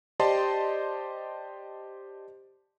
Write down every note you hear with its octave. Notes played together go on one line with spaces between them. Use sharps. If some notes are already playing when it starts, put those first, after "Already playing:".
G4 C5 D5 D#5 A5 C6